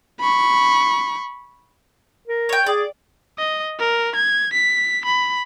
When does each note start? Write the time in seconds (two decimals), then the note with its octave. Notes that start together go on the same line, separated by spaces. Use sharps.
0.21 B5 C#6
2.27 A#4
2.49 C#5 G5
2.67 G#4 D5
3.38 D#5
3.79 A#4
4.15 G#6
4.53 B6
5.05 B5